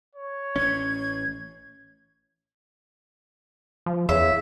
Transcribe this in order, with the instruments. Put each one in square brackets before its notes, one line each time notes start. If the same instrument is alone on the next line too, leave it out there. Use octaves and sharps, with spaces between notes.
[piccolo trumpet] C#5
[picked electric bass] A1 C#4 [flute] G#6
[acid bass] F3
[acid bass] E2 [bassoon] C#3 [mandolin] E5